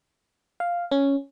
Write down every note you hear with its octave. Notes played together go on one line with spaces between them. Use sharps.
F5
C#4